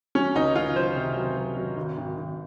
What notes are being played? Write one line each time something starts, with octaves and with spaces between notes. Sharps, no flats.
F#3 C#4
C#2 D#4
C#2 F4
F#3 C5
C3
F#3
F#3
F#3
G#1
G#1
G#1